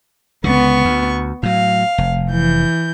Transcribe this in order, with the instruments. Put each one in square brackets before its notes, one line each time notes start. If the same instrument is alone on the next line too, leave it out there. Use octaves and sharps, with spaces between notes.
[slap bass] C#2 D3 [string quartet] B3 C#6
[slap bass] D2
[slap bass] A2 F#3 [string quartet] F5
[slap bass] F1
[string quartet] E3 G6